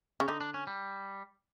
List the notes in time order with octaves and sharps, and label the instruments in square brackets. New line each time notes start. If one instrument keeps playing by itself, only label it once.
[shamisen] C#3
[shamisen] D3 [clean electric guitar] D#4
[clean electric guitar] D4
C#4
G3